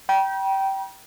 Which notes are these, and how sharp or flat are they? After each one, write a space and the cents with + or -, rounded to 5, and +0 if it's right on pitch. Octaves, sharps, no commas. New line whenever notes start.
G5 -15 B5 -45